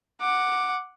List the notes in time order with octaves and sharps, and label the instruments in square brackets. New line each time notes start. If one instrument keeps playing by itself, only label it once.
[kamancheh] F#5 D6